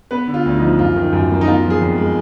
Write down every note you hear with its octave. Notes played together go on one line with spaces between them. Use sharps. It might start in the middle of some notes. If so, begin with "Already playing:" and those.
B3 B4
D3
F4
D2
D#4
F3
F#2 F4
D#3
F#2
A#3
D#4
B3 F4
F3
G#4
F2
G#3